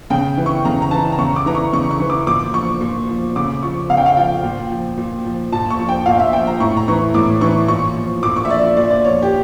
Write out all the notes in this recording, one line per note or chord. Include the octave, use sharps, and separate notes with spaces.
C#3 G5
E3
C#6
C#3 A#5
A#5
E3 A5
A#5
C#3 C#6
D6
E3 A#5
C#6
C#3 C#6
C#6
E3
D6
A#2 D6
F3 C#6
A#2
F3
C#3 D6
F3 C#6
C#3 F5
G5
F5
F3 G5
A#2
F3
A#2
F3
A#2 A5
C#6
F3
G5
A#2 F5
E5
F3 G5
A#5
A2 C#6
A#5
E3 C#6
A2 D6
E3 C#6
A#2 C#6
F3
A#2 D6
C#6
E5
F3 D5
D5
A#2 D5
D5
F3 C#5
G4